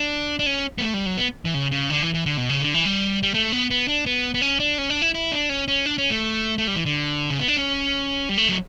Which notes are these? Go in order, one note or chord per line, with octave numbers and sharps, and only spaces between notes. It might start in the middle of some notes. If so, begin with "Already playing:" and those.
Already playing: D4
D4
C#4
B3
A3
G3
F#3
B3
E3
C#3
C#3
D3
E3
E3
D3
B2
C#3
D3
E3
G3
G3
A3
B3
B3
D4
B3
B3
C#4
D4
C#4
D4
E4
E4
D4
C#4
C#4
D4
C#4
A3
A3
G3
E3
D3
C#3
B3
D4
C#4
G3
A3
F#3